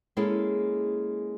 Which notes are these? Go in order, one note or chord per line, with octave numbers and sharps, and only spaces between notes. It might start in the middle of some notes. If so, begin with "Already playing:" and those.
G#3 A#3 C#4 E4 G#4 A4